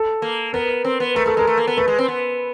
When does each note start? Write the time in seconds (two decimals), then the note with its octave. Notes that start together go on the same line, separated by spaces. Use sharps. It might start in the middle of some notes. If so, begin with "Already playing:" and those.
Already playing: A4
0.22 A#3
0.53 B3 A#4
0.85 C4
1.00 B3
1.15 A3 A#4
1.26 A3 A4
1.37 G#3 A#4
1.47 A3
1.57 A#3
1.67 B3
1.77 A3 B4
1.88 G#3
1.98 C4
2.08 B3